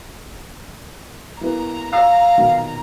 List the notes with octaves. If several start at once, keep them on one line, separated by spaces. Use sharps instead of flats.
E3 A#3 B3 A#5
C#5 F5 E6
B1 A#2 D#3